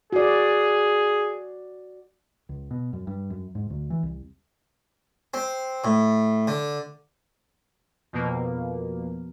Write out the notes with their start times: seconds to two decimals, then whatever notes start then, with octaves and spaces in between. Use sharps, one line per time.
0.12 F#4 G#4 D5
2.49 C#2
2.71 B2
2.93 F#2
3.07 G2
3.30 F#2
3.55 G#2
3.70 D2
3.90 E3
4.03 C2
5.34 C4
5.84 A2
6.47 D3
8.13 F2 B2 A#3